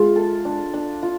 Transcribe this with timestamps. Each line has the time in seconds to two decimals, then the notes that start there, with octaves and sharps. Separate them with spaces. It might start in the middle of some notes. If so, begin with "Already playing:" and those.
Already playing: G#3 F4 G#4
0.16 A4
0.45 D4
0.74 D4
1.03 F4